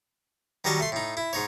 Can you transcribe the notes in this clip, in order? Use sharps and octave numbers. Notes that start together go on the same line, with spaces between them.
D#3 F#3 G3 D#5 A5 C#6
A3 C6
A2 D#4
E4
G#2 D#4 C#5